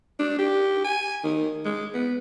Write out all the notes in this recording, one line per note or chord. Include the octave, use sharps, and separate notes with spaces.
D4
G4
G#5
D#3
G#3
B3